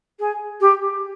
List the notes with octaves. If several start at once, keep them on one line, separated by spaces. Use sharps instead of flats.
G#4
G4